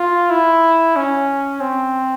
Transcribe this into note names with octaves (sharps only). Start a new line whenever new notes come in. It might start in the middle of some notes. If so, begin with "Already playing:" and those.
Already playing: F4
E4
C#4
C4